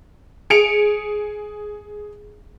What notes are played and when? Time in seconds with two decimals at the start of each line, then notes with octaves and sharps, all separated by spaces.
0.50 G#4 C#7 D7 F7